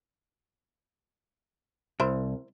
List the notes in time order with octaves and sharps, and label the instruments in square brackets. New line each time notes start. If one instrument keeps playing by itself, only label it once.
[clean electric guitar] C2 [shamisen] E4 A#4 C5